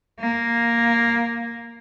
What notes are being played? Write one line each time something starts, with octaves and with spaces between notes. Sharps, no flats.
A#3